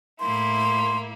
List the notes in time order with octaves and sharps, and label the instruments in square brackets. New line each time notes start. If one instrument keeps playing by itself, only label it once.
[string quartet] A2 A#3 E4 [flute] C6